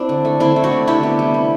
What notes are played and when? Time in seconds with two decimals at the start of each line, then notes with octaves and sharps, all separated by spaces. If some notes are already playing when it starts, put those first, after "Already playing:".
Already playing: C4 D4 E4
0.09 D3
0.25 A3
0.40 D3 C4 E4
0.56 A3
0.64 D4 F#4
0.72 D3
0.87 C3 E4 G4
1.03 B3
1.19 G3
1.34 C3